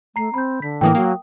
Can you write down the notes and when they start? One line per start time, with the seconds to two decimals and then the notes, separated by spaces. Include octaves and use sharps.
0.16 A3 A#5 C7
0.34 C4 B5 G6
0.62 D3 B6
0.81 A2 E3 A#3 G5 D#6
0.95 F#3 A#3